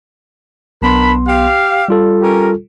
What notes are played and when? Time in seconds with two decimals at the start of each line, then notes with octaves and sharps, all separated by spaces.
0.82 B1 B3 D4 A#4 B5 C6
1.27 G4 F5
1.88 G3 F4 A4
2.22 C#4 G4 A#4